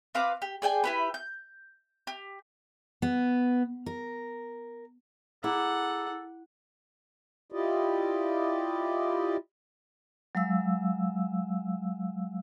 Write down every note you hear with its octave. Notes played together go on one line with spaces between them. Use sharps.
C4 B4 F5 D6
G4
G#4 D5 G5 G#5
E4 G4 B4
G6
G4
B3
A#4
E4 G#4 A4 F#5 A#5 D6
E4 F4 G4 D5 D#5
F#3 G#3 F5 E6